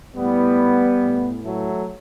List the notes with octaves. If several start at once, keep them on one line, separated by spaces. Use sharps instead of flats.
A2 E3 G3 B3
A2 E3
F#3 A3